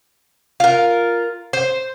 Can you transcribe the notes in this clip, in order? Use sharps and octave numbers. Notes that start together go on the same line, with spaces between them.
F4 A#4
C5